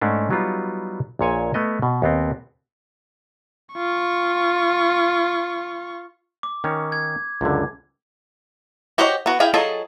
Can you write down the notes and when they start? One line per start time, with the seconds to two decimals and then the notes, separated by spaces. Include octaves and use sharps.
0.01 G#2 A3 C#4 D4
0.30 F#3 G3 B3 D#4 F4
1.19 A#1 A#2 C#5 G#5
1.54 A3 B3 D#5
1.82 B2
2.02 D#2 B3 C4
3.75 F4 C#6
6.43 D6
6.64 D#3 C#4 C#5
6.92 G#6
7.41 C#2 F#2 D3
8.98 F#4 G4 C5 C#5 D#5
9.26 B3 F#4
9.40 E4 G#4 F5 G5
9.54 F#3 F4 G#4 A4 D#5